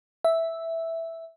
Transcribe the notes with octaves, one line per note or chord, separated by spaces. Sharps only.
E5